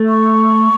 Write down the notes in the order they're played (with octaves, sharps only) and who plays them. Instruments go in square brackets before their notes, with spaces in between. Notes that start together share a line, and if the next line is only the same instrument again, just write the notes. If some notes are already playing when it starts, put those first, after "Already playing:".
Already playing: [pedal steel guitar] A3
[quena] C#6